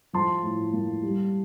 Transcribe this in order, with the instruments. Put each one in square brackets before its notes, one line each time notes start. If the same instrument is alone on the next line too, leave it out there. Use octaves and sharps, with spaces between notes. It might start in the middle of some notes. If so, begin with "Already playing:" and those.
[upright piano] F3 A5 C6
A2
A#3
G3